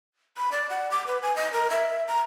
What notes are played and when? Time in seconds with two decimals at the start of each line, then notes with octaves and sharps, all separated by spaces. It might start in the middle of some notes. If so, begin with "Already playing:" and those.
0.37 B5
0.52 D5
0.70 F#5
0.91 D6
1.07 B4
1.22 G#5
1.36 D#5
1.53 A#4
1.70 E5
2.08 A#5